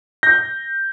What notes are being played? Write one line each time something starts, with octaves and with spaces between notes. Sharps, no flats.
G6 A#6